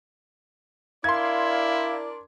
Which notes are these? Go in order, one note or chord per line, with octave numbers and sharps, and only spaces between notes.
D4 E4 A#4 D5 F5 C6 G#6